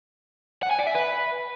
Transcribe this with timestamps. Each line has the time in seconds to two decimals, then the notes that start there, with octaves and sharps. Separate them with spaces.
0.63 F#5
0.71 G#5
0.79 D5
0.87 E5
0.95 B4